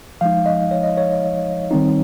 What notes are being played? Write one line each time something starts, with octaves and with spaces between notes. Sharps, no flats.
F3 G#3 D#4 F5
D#5
C#5
D#5
C#5
D#3 G3 C4 D#4